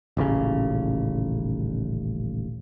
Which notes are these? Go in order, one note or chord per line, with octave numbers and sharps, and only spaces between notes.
D#1 A1 C#3